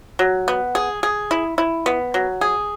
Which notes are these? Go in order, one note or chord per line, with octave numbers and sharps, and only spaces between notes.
F#3
B3
G#4
G#4
E4
E4
B3
F#3
G#4